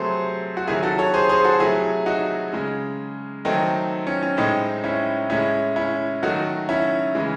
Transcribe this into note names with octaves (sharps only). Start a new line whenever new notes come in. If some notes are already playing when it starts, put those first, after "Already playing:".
Already playing: C3 F#3 A3 G#4 C5
F#4
C3 D#3 F#3 E4 G#4
F#4 A4
A4 C#5
G#4 C5
G#4 C5
F#4 A4
C3 F#3 A3 E4 G#4
D#4 F#4
C#3 G#3
D#3 F#3 A3 C4 D#4
C#4
C#4
A2 G#3 C4 D#4
C#4 E4
A2 G#3 C#4 E4
C#4 E4
D#3 F#3 A3 D#4 F#4
C#4 E4
C#3 E3 G#3